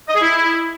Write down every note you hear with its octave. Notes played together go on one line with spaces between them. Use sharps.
D#5
G#4
E4